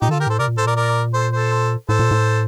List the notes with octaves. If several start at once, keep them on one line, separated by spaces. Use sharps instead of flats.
A#2 D#4 G4
D#3 F4 A4
D3
G4 A#4
A2 A4 C5
C3 A#4 D5
A#2
A2 A4 C5
A#2 A#4 D5
A#4 D5
A4 C5
A4 C5
A2 A4 C5
A#2
A2